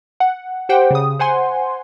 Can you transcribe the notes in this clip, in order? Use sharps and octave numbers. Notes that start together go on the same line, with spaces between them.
F#5
G4 C5 F#5 G5
C#3 D#6
C5 F#5 G#5 C6